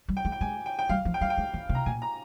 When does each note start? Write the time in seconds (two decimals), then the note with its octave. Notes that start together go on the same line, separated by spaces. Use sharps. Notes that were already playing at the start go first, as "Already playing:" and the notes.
0.08 G3
0.17 G5
0.25 G#3
0.32 G5
0.41 G#3 G#5
0.66 G5
0.79 G5
0.89 G3 F5
1.05 F3
1.14 G5
1.21 G3 F5
1.30 G5
1.37 G#3
1.54 D#3
1.69 C3
1.75 A#5
1.86 A#2 G#5
2.02 A#5